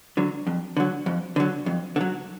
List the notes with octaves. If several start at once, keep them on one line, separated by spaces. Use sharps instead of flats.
D3 F#3
F2
D3 F#3
F2
D3 F#3
F2
D3
F#3